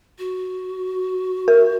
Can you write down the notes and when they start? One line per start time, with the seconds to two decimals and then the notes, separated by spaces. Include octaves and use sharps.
0.19 F#4
1.48 A#4